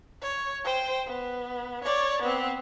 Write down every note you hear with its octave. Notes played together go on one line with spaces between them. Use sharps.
C#5
C5 G5
B3
C#5 D5
B3 C4